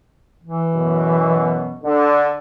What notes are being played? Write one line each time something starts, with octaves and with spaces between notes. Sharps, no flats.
E3
F#2 B2
D3